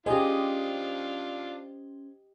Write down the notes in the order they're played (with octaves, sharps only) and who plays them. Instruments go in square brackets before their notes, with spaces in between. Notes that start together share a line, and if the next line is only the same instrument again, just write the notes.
[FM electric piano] C#4 C5 [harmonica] D4 F4 [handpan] G4 D#5 [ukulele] G#4